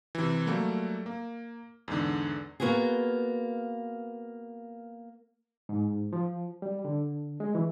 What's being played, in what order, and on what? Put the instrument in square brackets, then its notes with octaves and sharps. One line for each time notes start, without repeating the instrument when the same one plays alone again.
[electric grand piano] C3 E3
F#3 G3 A3 A#3
A#3
E2 G#2 D3
[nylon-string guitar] A#3 B3 F4 F#4 G#4
[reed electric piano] G#2
F3
G3
D3
G#3
E3